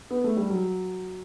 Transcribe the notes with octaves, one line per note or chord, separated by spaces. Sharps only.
B3
A3
G3
F#3